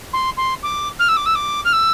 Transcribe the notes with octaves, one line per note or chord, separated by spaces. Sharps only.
C6
C6
D6
F6
E6
D6
E6
D6
F6
E6